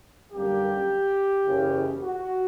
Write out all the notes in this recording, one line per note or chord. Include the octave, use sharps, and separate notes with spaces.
F#2 D3 G3 A#3 G4
F#1 E2 C#3
F#4